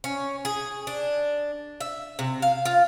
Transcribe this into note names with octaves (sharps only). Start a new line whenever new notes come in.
C#4
G#4
D4
E5
C3
F5
F4